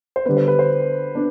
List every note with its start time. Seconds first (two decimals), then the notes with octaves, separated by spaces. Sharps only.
0.16 C5
0.26 D3 G3 B3 B4
0.37 C5
0.48 B4
0.59 C5
1.15 B3 D4